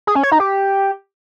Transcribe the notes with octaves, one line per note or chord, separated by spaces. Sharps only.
G#4
C#4
C#5
D#4
G4